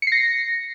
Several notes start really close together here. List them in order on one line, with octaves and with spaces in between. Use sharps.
C#7 C7 A#6